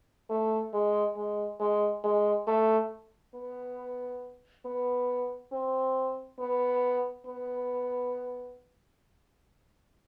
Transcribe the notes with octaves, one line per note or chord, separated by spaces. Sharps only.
A3
G#3
G#3
G#3
G#3
A3
B3
B3
C4
B3
B3